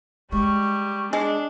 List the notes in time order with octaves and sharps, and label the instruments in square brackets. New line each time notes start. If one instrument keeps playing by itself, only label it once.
[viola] G3 [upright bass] G#3 [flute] C#6
[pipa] G#3 [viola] D4